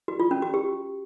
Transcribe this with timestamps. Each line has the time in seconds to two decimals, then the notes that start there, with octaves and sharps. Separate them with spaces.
0.08 F#4
0.20 F4
0.31 C#4
0.42 F#4
0.54 G4